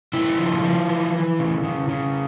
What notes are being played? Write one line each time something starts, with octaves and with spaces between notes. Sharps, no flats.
C#3 E4
F3
F3
E3
E3
C#3
C#3
C#3